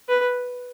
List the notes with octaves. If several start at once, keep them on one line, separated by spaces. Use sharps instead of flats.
B4